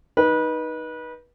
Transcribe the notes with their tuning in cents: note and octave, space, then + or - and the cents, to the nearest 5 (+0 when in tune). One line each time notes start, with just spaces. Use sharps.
D#4 +0 B4 -25